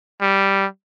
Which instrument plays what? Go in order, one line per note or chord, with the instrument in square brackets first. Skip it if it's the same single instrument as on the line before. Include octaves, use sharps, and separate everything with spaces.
[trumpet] G3